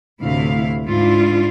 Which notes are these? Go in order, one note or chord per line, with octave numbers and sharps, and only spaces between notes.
D2 A2 C3 E4 F5
G#2 D4 E4 F4